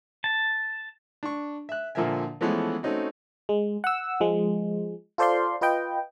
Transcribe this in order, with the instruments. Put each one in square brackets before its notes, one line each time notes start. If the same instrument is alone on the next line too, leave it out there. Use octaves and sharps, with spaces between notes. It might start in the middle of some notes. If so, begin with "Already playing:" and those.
[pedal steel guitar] A5
[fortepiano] D4 C#6
E5 F#6
A#2 D3 F3 A#4 E5 G#5
E3 F3 G#3 A3 B3 C#4
A3 C4 C#4 D#4 F#4
[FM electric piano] G#3
F#5 E6
F3 G#3
F4 A4 C5 D5 F5 C6
F4 B4 D#5 G5